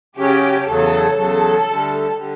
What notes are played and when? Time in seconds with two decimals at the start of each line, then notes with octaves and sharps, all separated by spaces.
0.17 C#3 F#3 C#4 G4
0.66 E2 C#3 F#3 A4
1.17 E2 C#3 F#3 A4
1.66 D2 D3 G3
2.16 D3 G3